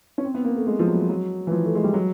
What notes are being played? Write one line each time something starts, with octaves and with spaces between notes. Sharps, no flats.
C#4
C4
B3
A#3
A3
G#3
F3
F#3
F#3
E3
F3
A3
G#3
G3
F#3